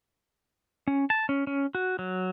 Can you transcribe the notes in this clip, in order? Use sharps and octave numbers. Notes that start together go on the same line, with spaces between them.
C#4
A5
C#4
C#4
F#4
F#3